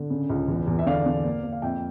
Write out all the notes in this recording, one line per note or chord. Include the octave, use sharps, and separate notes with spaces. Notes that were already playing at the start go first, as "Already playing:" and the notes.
Already playing: D3
C#3
C#2
E2
E2
E5
D3 D5 F5
D3
A#3
A#3
F5
F2 E5 G5